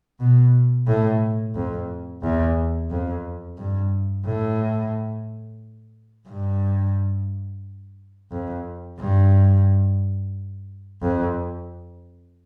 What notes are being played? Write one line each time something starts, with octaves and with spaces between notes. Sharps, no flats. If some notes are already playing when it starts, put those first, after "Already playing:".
B2
A2
F2
E2
F2
G2
A2
G2
F2
G2
F2